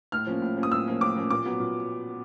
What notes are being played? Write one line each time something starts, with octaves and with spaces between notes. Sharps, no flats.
A2 F6
F3 A#3 C#4
A2
F3 A#3 C#4
D#6
A2 E6
F3 A#3 C#4
A2 D6
F3 A#3 C#4
A#2 D6
F#3 B3
A#2